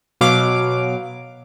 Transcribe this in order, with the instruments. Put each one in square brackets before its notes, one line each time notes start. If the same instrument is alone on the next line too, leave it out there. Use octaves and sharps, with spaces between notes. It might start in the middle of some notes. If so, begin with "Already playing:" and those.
[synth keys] B2 F#3 F5 D6